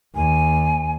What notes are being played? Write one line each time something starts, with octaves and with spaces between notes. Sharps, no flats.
D#2 G#5